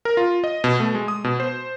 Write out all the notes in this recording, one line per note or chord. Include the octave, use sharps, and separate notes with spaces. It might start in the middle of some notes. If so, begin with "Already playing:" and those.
A#4
F4
D#5
B2
A3
G#3
D#6
B2
C5